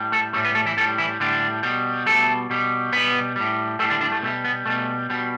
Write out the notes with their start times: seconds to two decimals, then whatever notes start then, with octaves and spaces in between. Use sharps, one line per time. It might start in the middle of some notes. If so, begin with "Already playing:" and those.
Already playing: A2 G3
0.12 A3 A4
0.33 A2 G3 A3 A4
0.45 B3 B4
0.55 A3 A4
0.66 E3 E4
0.77 A2 G3 A3 A4
0.98 E3 E4
1.20 A2 D3 G3 D4
1.63 B2 G3
2.06 B2 G3 A3 A4
2.50 B2 G3
2.93 B2 G3 B3 B4
3.36 A2 G3
3.79 A2 G3 A3 A4
3.90 D3 D4
4.01 D3 D4
4.12 A3
4.23 B2 G3 A3
4.44 B3
4.66 B2 G3 A3
5.10 B2 G3